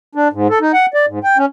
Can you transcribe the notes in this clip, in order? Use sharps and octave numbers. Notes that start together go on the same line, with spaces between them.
D4
G#2
A4
D#4
F#5
D5
G#2
G5
C#4